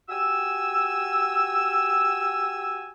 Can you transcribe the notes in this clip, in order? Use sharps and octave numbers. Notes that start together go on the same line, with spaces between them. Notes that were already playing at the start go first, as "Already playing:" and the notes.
F#4 G4 G#5 E6